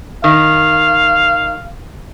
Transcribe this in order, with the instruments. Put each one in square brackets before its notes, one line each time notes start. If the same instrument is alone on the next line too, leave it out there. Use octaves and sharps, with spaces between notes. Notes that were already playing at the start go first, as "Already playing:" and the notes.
[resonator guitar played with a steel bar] D#3 [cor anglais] F5